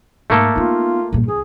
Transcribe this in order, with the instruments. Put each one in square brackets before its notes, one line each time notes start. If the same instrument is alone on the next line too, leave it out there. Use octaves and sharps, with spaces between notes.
[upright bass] G#2 [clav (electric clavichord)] A3 A#3 A4
[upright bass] B3 D#4 [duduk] F4
[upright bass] G1 A#2
[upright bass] C#2 [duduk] G#4